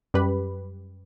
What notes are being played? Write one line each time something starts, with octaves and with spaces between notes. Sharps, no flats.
F#2 G3 G4 B4 B5